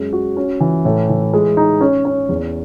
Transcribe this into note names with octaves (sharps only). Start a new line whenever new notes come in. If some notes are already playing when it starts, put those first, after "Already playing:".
Already playing: F#2 G#3
F#4
C#4
E3
A2
E3
G#3
D#4
C#4
C#4
E2